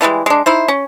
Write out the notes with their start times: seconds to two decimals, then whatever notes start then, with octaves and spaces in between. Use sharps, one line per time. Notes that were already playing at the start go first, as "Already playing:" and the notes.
0.01 D3 E3 G3 G#3
0.26 G#3 D4
0.46 D#4 E4 C5
0.68 C#4